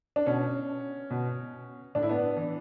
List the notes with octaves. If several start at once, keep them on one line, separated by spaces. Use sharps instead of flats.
D4
B2 C#4
B2
A2 D4
E4
B3 D4
E3